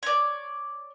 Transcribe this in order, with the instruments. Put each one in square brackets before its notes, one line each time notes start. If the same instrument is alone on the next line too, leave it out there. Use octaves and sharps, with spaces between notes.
[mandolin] C#5 D5